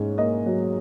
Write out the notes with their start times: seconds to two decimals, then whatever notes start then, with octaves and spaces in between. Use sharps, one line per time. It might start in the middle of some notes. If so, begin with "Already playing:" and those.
Already playing: G#2 C#4
0.18 A#3 D#5
0.46 F#3